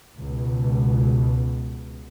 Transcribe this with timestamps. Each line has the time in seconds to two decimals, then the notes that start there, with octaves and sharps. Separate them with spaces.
0.19 C#2 B2